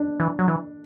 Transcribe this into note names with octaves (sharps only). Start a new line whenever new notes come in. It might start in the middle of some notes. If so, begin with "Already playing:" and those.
Already playing: D4
E3
F#3
E3